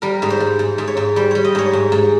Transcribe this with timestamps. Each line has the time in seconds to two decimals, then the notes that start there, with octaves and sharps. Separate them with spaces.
0.02 G3 A#4
0.22 G#2
0.30 C5
0.40 G#2
0.59 G#2
0.78 G#2
0.88 C#5
0.97 G#2
1.16 G3 C5
1.31 G3 C#5
1.45 D#5
1.55 G#2 C#5
1.73 G#2
1.92 G#2